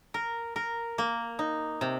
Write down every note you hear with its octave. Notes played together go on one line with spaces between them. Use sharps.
A#4
A#4
A#3
D#4
C3